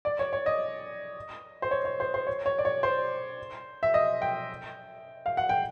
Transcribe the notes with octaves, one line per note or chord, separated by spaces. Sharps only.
D5
C#5
C#5
D#5
C5
C#5
C#5
C5
C5
C#5
C#5
D5
C#5
C5
E5
D#5
G5
F5
F#5
G5